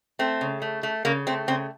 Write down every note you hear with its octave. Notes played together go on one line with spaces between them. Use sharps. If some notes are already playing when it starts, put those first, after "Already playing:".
A3 C4
C#3
A3
A3
C#3 A#3
A3 C4
C#3 C4